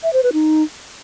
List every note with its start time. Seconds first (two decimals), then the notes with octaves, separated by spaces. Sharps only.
0.03 E5
0.13 C5
0.23 B4
0.33 D#4